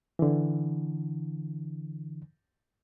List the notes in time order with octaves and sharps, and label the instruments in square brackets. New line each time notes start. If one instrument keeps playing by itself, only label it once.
[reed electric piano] D3 E3